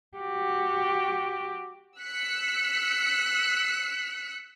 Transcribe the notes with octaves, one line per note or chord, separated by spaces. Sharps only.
F#4 G4
E6 F#6 B6 C#7